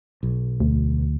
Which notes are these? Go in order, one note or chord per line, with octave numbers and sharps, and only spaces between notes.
B1
D2